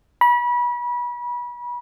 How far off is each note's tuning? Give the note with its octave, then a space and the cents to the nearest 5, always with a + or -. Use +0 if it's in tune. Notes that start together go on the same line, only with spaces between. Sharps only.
B5 -30